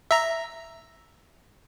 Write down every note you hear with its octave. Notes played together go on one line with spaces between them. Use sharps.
E5 A#5